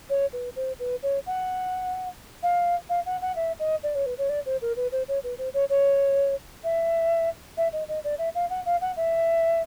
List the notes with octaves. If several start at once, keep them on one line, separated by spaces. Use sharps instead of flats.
C#5
B4
C5
B4
C#5
F#5
F5
F5
F#5
F#5
E5
D#5
D5
C#5
B4
C#5
D5
C5
A#4
B4
C5
C#5
B4
C5
C#5
C#5
E5
E5
D#5
D#5
D5
E5
F5
F#5
F5
F#5
E5